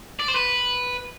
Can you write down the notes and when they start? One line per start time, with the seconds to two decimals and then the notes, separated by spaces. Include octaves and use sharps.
0.20 D5
0.28 C5
0.36 B4